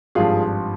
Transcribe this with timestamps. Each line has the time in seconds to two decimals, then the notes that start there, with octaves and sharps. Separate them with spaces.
0.15 G#1 G2 F3 F4 G#4